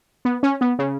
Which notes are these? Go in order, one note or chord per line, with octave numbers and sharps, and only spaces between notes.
B3
C#4
B3
C#3